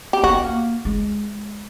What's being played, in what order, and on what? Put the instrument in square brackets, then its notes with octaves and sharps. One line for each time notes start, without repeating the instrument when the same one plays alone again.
[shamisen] G4
[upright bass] B3 [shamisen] F#4
[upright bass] A#3
G#3